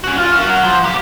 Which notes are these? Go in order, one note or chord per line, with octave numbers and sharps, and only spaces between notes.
C#4 F#4
F4
F#4 A#4
F#3
F3
B1 G4